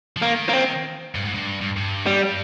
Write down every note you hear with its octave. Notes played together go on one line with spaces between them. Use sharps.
F3
D#3 A#3
A#3
C4
G2
G#2
G2
G2
G2
G3